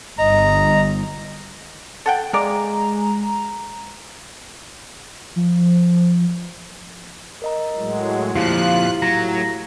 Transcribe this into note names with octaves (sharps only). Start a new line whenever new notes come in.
G1 D#5 A#5
A4 F#5 G5
G#3 D5 F5 A#5
F3
A#4 D#5 A#5
A2 F#3 G#3
F2 A#2 F3 E4 F4 G4 F5 F#6
A2 F#3 A#5